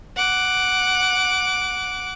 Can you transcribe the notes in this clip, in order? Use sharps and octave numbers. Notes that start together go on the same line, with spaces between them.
F#5 D6